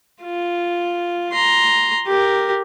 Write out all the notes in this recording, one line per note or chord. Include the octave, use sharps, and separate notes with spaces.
F4
A#5 C6
G4 A#4